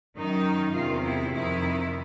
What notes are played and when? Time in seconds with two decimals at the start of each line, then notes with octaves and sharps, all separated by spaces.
0.16 F#2 D#3 D#4
0.74 E2 C3 D#3 F4
1.03 E4
1.31 F2 C3 D#3 E4